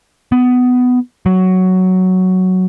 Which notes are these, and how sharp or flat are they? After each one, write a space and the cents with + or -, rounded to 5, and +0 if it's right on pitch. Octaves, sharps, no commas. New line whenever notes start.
B3 +15
F#3 +5